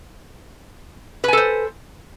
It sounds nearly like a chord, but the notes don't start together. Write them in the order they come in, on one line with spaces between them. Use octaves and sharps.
B4 G#5 A4 C5